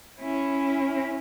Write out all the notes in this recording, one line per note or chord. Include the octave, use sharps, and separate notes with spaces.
C#4 E4